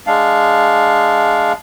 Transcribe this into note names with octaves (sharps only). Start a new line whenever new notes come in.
G#3 D4 F5